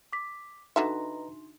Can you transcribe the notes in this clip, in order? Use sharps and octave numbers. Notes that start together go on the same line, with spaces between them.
D6 B6
D3 D#4 F#4 B4 D#5 E5 A#5 C6